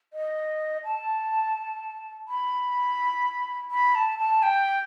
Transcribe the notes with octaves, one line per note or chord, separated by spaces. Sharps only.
D#5
A5
B5
B5
A5
A5
G5